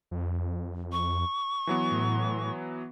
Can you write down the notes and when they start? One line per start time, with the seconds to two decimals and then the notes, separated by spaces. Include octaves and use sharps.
0.11 F2
0.92 C#6
1.67 E3 F#3 B3
1.91 A2